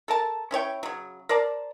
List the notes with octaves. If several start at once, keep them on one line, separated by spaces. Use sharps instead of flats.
A4 A#4 A5
C#4 E4 C#5 G5
C#3 F#3
A#4 C5 D5 A5